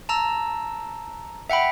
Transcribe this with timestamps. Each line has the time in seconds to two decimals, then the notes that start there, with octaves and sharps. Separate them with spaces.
0.09 A5 A#5 E6
1.50 E5 F#5 G5 B5